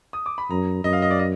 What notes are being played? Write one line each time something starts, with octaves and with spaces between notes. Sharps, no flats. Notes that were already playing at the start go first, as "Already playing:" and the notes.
D#6
D6
B5
F#2 A#5
F#2 D#5
F5
D#5
D5
D#5